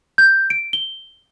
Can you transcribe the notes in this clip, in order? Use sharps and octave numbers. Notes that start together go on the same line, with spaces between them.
G6
D7
G7